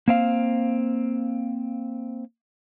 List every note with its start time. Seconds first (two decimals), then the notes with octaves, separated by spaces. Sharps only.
0.08 A#3 C4 F5